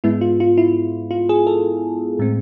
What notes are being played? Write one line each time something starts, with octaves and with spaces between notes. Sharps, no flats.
G#2 G#3 B3 E4
F4
F4
E4
F4
G#4
A4
A2 G#3 C4